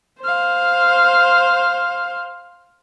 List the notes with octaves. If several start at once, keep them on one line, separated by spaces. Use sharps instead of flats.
C5 F5